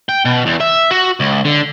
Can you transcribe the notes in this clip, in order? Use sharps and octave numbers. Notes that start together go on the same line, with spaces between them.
G5
B2
E2
E5
F#4
C#2
D3